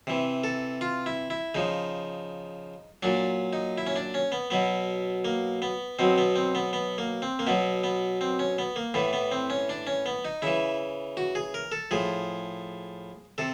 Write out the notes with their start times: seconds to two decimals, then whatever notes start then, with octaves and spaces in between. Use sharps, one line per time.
0.07 C3 E3
0.44 A4
0.81 F4
1.06 E4
1.30 E4
1.55 C#3 F3 D#4
3.03 A#2 F#3 D4
3.53 D#4
3.78 E4
3.87 C#4
3.96 D4
4.14 C#4
4.32 B3
4.50 B2 F#3 B3
5.25 A#3
5.62 B3
5.99 B2 F#3 C4
6.18 B3
6.36 C4
6.55 B3
6.73 B3
6.98 A#3
7.22 C4
7.39 A#3
7.47 B2 F#3 B3
7.84 B3
8.21 C4
8.39 C#4
8.58 B3
8.76 A#3
8.94 A2 E3 B3
9.13 B3
9.32 C4
9.50 C#4
9.69 D4
9.87 C#4
10.06 B3
10.25 D#4
10.42 C#3 E3 E4
11.17 F#4
11.35 G#4
11.54 A#4
11.72 A4
11.91 A2 F3 G#4
13.38 C3 A4